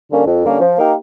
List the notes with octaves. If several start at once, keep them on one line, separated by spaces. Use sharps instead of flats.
D3 G3 A#3 C#4
F2
D3 G3 A#3 C#4
F3
A#3 D#4 G4 A#4